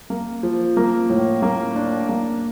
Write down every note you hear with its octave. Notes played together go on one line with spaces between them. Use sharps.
A#3
F3
A#3
A2
A#3
D4
A#3